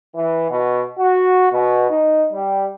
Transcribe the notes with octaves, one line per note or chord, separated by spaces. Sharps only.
E3
B2
F#4
B2
D#4
G3